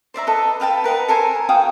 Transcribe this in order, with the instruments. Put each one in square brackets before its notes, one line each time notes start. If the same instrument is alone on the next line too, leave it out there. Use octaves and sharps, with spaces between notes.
[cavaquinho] C5 D5 E5 A#5
A4 B4 D#5
B4 F5 G5 A5
A#4 B4 D#5 F#5
A4 A#4 C5 G#5
F#4 F5 G5 D#6